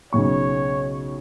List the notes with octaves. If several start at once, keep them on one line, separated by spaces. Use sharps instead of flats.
B1 C#3 C#5 C#6